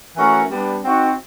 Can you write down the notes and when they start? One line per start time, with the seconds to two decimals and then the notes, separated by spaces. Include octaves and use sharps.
0.17 E3 A3 C#4 F#4 A#4
0.50 G3 B3 D4
0.83 C4 D#4 F#4